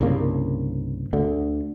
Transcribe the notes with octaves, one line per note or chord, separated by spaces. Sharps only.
C2 G2 C#3 A#3
D2 D3